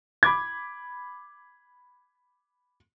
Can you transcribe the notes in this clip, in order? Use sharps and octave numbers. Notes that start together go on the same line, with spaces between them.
B5 D6 G#6